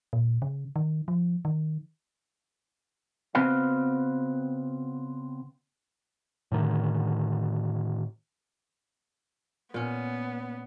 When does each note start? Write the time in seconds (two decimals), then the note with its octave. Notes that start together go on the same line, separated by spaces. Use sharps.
0.13 A#2
0.42 C#3
0.76 D#3
1.08 F3
1.45 D#3
3.35 C#3 B3 C4 F#4 B4 F5
6.52 A2 D3 D#3
9.74 A#2 B3 C#4